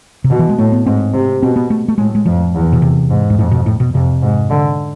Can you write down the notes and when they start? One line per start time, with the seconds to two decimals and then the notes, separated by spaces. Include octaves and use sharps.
0.24 C3
0.30 B2 D3
0.39 E3
0.49 G#3
0.58 A2 A3
0.72 B3
0.86 G#2 C4
1.14 C3
1.42 B2 C4
1.56 B3
1.70 A3
1.88 A3
1.98 A2 G#3
2.15 G#3
2.26 F2 F3
2.54 E2
2.73 B2
2.82 C3
3.10 G#2
3.30 G#2
3.38 F2 A2
3.52 B2
3.66 A2
3.80 B2
3.94 F2 C3
4.22 G#2
4.50 D3